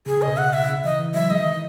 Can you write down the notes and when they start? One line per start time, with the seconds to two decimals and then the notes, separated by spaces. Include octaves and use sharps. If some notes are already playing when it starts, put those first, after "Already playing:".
0.06 C#3 G#4
0.17 C#3
0.22 D#5
0.27 B2
0.37 F#5
0.53 E5
0.69 C#3
0.84 E3 D#5
1.00 E3
1.14 F#3 E5
1.30 G#3 D#5
1.40 D#3
1.51 E3